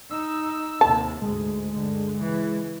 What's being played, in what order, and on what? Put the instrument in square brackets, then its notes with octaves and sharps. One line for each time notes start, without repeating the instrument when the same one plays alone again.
[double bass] D#4 [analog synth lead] E6
[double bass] D#2 C3 [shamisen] A5
[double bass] D2 G#2 [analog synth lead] G#3
[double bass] G2 D3
C#3 E3